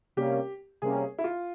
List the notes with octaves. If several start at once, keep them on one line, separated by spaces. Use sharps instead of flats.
C3 G3 A#3 C#4 G4
C3 G3 A#3 C#4 G#4
E4
F4